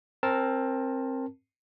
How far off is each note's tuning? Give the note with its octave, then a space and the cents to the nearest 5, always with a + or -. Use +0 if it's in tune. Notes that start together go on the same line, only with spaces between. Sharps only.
C4 +20 A#4 +0 A5 +0